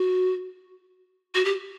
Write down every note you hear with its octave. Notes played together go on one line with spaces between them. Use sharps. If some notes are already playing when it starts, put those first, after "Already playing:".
Already playing: F#4
F#4
G4